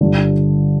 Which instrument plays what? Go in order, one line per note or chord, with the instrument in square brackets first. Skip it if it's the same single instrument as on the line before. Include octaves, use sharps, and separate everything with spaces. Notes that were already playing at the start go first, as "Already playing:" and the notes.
[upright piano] G1 G2 D3